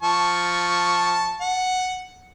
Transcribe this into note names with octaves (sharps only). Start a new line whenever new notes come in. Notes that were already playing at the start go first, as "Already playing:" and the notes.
F3 A5 C#6
F#5